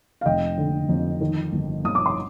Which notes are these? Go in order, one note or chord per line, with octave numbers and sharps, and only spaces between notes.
F5
F1 D#5 G5
D3
F2
D#3
G1
G1 D#6
D6
C6